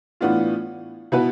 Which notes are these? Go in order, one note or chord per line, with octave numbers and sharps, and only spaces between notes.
A2 E3 B3 D4 F4
B2 B3 E4 B4